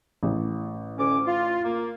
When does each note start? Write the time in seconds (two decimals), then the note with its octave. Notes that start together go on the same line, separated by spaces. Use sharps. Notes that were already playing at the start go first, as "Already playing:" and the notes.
0.23 A1
0.98 D2 C#4 D6
1.26 F4
1.63 A#3